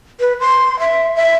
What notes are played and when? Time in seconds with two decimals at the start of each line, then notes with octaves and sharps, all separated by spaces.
0.20 B4
0.40 C6
0.80 E5
1.16 E5